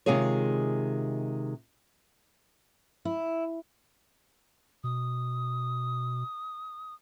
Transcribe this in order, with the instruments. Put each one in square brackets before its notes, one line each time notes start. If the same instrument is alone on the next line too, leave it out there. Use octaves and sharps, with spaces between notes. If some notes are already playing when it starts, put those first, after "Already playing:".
[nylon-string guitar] C3 D#3 G#3 F4 G#4 C#5
[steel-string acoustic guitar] E4
[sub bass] B2 [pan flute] D#6